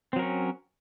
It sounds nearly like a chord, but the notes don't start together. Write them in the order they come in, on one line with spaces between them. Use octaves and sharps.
C4 F#3 A#4 C#4